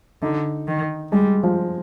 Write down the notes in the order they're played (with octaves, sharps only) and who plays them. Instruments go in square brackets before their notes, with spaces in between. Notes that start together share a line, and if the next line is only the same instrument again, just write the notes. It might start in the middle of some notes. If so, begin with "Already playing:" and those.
[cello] D3 [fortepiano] D#4
[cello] D#3
[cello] G3 [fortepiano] G#3
[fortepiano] F3